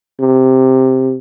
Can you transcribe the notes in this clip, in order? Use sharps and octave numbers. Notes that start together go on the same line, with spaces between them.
C3